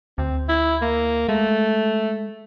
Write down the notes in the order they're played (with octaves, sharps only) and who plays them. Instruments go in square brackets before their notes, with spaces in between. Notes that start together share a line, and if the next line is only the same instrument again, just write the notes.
[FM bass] D2 [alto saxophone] C4
[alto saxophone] E4
A#3
[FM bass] G#3 [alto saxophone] A3